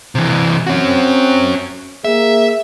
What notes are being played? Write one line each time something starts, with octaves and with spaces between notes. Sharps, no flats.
C3 E3
C4 C#4 F#4
A#3 G#4 E5